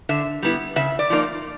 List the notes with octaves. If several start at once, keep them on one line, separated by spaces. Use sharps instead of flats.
D3 E5
G3 B3 E4
C#3 E5
D5
F3 A#3 D#4